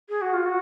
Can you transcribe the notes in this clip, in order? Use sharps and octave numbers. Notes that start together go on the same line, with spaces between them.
G#4
F#4
F4
F#4